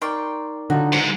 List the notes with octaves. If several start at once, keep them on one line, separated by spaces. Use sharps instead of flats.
D#4 A#4 D5 G5 C6 C#6
D3 F#3 D#4 F4 F#4
G#2 C5